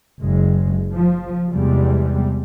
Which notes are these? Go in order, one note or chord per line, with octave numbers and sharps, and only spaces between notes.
F#1 G#3
F3
E2 C3 G3 G#3